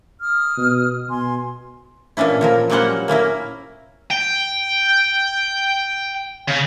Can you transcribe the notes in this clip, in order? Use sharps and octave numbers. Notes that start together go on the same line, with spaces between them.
D#6 F6
B2
B2 G#5 C6
A#2 E3 C#4 D4 E4
A#2 F3 A#4
F#3 G3 A#3 C#4 C5 F#5
A#3 C#4 E4 A#4
G5
C#3